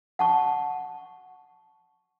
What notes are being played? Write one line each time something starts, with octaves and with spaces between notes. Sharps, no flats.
F#5 A5 C#6